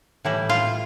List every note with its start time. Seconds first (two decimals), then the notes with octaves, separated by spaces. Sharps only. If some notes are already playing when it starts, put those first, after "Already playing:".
0.25 A2 E3 G3 E4
0.49 F4